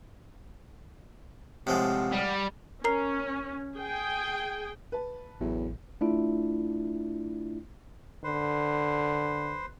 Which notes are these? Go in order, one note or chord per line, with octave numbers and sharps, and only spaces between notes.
A2 C3 F3 G#3 F#5 F6
G3
C#4 A#4 A#5 C7
G#4 G5
B4 A5
A1 E2 A2 F#3
A3 D4 E4 F4
D3 B4 C5